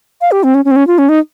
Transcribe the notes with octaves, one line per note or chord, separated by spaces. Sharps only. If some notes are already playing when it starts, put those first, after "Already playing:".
F5
G4
C4
C#4
C#4
C4
C#4
F4
C#4
D#4